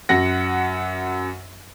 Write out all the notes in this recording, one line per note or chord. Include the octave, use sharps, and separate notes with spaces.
F#2 F#4 F#5 A#6